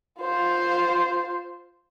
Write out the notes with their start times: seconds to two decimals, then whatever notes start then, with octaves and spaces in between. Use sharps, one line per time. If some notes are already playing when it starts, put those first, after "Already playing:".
0.21 F4 C5